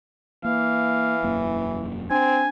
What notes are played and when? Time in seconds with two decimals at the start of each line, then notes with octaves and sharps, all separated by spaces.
0.45 E3 A#3 F5
1.23 E1 F#2 A#3
2.11 C4 D4 G#5